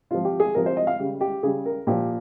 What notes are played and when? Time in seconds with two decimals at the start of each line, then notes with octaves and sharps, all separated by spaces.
0.11 C3 F3 F4
0.25 G4
0.40 G#4
0.55 C3 F3 A#4
0.66 C5
0.77 D#5
0.87 F5
0.99 C#3 G3
1.21 G4
1.43 C#3 G3 G#4
1.66 A#4
1.87 A#2 F3 G4